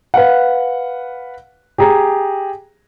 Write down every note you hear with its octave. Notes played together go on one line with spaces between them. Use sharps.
B4 F5 F#5
G4 G#4 A#5